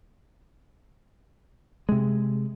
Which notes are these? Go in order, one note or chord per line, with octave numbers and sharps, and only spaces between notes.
C3 G#3